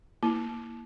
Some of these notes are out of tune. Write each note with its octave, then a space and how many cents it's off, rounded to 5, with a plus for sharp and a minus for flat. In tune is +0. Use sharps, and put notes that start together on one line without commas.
A#3 +0 E4 -10